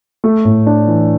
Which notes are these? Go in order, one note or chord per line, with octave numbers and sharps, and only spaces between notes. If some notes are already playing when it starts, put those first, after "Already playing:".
A3
A2
D4
E3